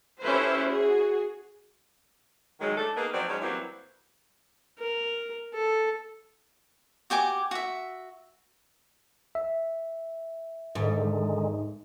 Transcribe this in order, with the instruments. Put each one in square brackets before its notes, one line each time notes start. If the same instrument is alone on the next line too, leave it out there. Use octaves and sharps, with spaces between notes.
[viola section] C#4 E4 G4 A4 B4 C5
F#4 G#4
[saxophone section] D#3 F#3 G#3
A3 D4 A4
A#3 B3 D#4 G#4 A#4 B4
F3 F#3 C4 D#4 C5 D5
F#3 G#3 C#4 D#4 C5 C#5
E3 F#3 G3 A#3 C4 E4
[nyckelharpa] A#4
A4
[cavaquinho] F#4 G4 G#5 D6
F#4 E5
[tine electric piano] E5
[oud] G#2 [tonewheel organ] D3 D#3 G#3